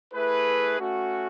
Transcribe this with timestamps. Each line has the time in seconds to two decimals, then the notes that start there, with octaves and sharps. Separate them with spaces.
0.14 A3 E4 G#4 B4
0.78 A3 C#4 F#4